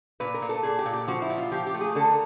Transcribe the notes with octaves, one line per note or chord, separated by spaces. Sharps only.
A#2 B4
A#4
A#2
A4
A#2 G#4
G4
A#2
G4
F3 F#4
E4
A#2
F4
F3 G4
G4
A3
G#4
D3 A4
A#4